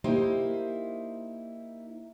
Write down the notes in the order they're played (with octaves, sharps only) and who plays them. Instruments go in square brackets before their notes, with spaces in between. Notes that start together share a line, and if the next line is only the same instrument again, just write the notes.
[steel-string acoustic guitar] A#3 D#4 E4 G4 C5